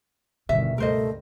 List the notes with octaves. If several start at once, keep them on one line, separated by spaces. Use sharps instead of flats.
G1 B2 D#3 E5
C#2 G2 A3 A#4 C5 D#5